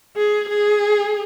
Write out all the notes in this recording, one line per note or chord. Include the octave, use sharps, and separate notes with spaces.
G#4
G#4